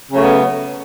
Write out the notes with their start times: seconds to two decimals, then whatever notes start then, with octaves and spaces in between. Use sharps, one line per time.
0.10 C#3
0.14 F#3
0.17 A3
0.21 B3